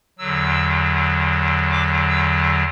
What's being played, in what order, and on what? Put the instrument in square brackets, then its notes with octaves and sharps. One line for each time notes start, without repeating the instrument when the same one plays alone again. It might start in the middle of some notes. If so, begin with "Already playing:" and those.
[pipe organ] E2 D3 F#3 E6
D6
E6